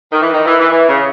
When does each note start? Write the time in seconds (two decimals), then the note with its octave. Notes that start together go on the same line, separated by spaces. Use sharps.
0.13 D#3
0.21 E3
0.33 D#3
0.46 E3
0.59 E3
0.72 E3
0.88 C#3